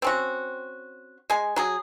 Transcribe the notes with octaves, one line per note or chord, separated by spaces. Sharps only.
C4 C#4 F#4
G#3 G#5
F#3 G#4